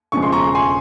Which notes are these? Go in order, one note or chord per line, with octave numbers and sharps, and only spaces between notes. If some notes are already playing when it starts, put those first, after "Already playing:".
E1 E2 C#3 F3 G#3 C#6
C6
A#5 C#6
G#5 C6